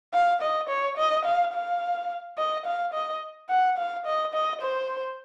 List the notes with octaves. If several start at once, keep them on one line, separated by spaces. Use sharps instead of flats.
F5
D#5
C#5
D#5
F5
F5
D#5
F5
D#5
F#5
F5
D#5
D#5
C5